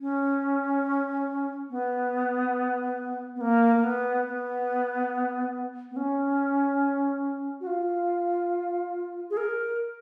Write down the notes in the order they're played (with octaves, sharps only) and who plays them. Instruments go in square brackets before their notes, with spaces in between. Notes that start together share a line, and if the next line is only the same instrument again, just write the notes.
[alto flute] C#4
B3
B3
A#3
A#3
B3
B3
B3
C#4
F#4
F4
G#4
A#4